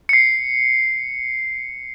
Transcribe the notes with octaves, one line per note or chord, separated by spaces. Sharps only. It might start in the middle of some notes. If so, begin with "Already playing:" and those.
C7 C#7